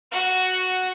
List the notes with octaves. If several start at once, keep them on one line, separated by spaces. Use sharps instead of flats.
F#4 F#5